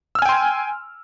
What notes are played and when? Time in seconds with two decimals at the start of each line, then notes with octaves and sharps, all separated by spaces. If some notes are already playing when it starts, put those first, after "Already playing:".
0.15 E6
0.19 F6
0.22 G#5
0.25 G5
0.29 C6